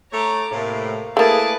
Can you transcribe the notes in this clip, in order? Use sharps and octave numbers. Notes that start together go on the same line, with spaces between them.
A3 C#5 A#5 D6
A2 C3 A#3
A3 A#3 E4 G#4 B4 A5 D6